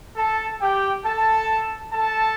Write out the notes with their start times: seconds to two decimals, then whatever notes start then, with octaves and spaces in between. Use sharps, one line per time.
0.17 A4 A5
0.61 G4 G5
1.04 A4 A5
1.92 A4 A5